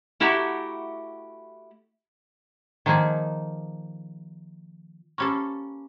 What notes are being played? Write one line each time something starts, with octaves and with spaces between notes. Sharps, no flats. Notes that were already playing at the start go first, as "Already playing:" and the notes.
A3 E4 F#4 G4 F#5 A#5
D#3 F3 A#3 D#4 G#4
A#3 C#4 G4 A4 B5 C#6